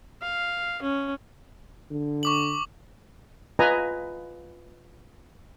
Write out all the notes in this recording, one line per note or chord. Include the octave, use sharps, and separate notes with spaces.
F5
C#4
D3
C#6 D6 F#7
F4 B4 D#5 G#5 A#5